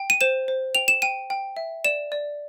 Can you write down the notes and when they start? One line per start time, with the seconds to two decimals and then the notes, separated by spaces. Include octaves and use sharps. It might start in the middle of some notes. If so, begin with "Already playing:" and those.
Already playing: G5
0.10 D#7
0.21 C5 E7
0.48 C5
0.75 G5 F7
0.88 E7
1.02 G5 D#7
1.30 G5
1.57 E5
1.84 D5 E7
2.12 D5